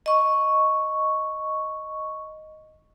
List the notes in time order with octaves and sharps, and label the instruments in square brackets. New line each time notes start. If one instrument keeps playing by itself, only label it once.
[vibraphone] D#5 C#6